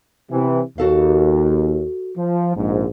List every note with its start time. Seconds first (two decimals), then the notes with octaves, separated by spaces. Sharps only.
0.31 C3 E3
0.78 D#2 F#4 A4 F5
2.17 F3
2.55 A#1 G#2